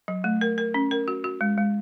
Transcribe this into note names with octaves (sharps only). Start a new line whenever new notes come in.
F#3
A3
A#4
A#4
C#4
A#4
F#4
F#4
G#3
G#3